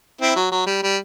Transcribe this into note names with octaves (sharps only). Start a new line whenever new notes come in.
C4 E4
F#3
F#3
G3
G3